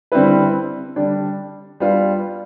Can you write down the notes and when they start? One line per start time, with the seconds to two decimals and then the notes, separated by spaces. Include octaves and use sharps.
0.12 D3 G3 C4 E4 B4
0.96 D3 G3 D4
1.80 G3 B3 D4 F4